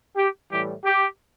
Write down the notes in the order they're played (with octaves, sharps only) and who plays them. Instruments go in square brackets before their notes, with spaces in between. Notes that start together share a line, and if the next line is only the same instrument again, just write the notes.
[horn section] G4
A2 E3 G3 G4
G4